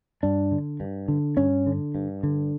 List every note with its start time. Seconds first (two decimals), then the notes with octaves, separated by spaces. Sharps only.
0.23 G2 D4
0.52 D3
0.80 G2
1.08 D3
1.37 G2 C#4
1.67 D3
1.95 G2
2.23 D3